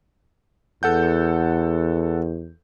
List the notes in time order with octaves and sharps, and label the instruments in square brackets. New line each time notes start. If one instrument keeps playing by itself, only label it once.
[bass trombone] E2 [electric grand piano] A4 F#5 G6